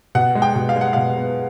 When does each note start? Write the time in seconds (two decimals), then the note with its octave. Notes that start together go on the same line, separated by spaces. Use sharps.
0.15 B2 F#5
0.35 G#3
0.42 G5
0.55 B2
0.69 F5
0.76 G#3
0.81 F#5
0.93 B2 F5
1.17 B3